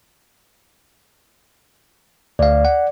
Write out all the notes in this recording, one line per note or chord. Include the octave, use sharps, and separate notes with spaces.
D2 D5 F5
F#5